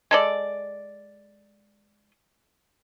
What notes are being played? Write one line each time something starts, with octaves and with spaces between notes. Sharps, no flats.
G#3 A4 D5